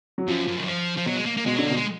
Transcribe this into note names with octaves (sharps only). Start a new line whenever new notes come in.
F#3
F#2 F3
F#2
D#3
F3
F3
B2 F#3
G#3
A#3
A#3
B2 G#3
D3 F#3
B2 A#3
G#3